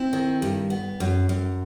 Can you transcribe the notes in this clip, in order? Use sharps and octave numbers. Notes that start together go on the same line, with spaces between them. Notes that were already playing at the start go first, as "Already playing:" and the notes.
Already playing: C4 E4
D#3
G2
B3
F#2
F#2